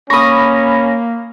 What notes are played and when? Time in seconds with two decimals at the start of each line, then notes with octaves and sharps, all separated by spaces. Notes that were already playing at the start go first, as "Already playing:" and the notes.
0.10 A#3 C#4 B5 C#6 D#6 A#6